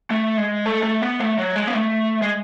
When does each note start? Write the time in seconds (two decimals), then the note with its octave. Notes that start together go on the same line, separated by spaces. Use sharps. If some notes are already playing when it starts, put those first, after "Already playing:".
0.10 A3
0.37 G#3
0.66 A3
0.83 A3
1.02 B3
1.20 A3
1.38 F#3
1.56 G#3
1.67 B3
1.74 A3
2.22 G#3